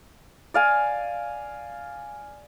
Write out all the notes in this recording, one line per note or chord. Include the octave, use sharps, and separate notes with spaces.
D5 F5 G#5